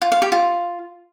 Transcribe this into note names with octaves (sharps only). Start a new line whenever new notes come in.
F4
F5
G4
F4